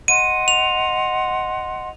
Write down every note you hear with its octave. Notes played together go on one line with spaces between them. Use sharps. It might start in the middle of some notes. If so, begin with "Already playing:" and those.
D#5 F#5 C6 D#7
F7